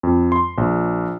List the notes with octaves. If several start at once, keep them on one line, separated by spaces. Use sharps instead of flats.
F2
C6
A#1